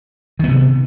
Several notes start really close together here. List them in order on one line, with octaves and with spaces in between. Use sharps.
D#3 B3 C3